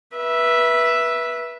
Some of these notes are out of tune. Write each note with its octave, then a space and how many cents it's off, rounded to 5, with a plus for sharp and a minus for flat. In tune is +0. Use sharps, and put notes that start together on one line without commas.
B4 -25 E5 +0